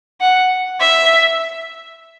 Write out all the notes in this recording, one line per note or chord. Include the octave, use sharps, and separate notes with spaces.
F#5
E5